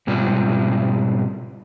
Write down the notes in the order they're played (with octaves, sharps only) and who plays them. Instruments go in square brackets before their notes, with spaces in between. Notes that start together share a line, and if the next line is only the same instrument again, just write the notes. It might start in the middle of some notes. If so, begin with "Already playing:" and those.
[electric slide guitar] G#2 B2 G3 C4 F4